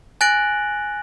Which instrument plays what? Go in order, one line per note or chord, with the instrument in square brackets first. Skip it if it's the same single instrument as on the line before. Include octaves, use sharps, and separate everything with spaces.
[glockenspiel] G#5 F#6 A6 A#6 D7 F#7